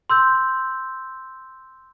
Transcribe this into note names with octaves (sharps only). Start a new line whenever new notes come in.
C6 E6 G6